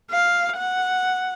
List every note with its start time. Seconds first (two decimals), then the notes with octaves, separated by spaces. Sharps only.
0.11 F5
0.57 F#5